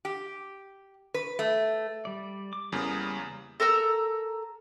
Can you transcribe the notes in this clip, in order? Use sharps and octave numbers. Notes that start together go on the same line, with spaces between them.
G4
B4
A3
G3 D5
D6
E2 C#3 G3 A#3 D#6
A4 A#4 A#5 E6